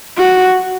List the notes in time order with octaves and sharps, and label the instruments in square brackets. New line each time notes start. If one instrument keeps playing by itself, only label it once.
[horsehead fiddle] F#4